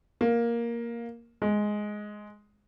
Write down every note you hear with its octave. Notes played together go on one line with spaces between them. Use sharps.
A#3
G#3